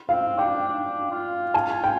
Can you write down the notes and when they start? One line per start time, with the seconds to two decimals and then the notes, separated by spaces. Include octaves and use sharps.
0.09 C4 F5
0.38 D4 G5
0.68 D4
1.11 F4
1.54 G#5
1.84 G5